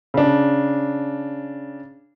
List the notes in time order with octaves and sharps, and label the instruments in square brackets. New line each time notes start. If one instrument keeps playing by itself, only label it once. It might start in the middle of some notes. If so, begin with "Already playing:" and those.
[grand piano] C#3 D4